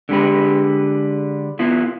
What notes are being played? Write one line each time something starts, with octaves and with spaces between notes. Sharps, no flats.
D3 G#3 G4 B4
B3 E4 F4